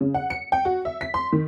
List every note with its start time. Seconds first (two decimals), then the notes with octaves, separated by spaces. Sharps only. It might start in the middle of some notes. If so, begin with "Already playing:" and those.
0.01 C#3
0.14 F#5
0.30 C#7
0.52 G5
0.65 F#4
0.85 E5
1.01 B6
1.14 C6
1.32 D#3